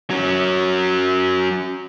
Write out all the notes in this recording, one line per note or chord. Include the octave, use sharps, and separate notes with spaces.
F#3 C#4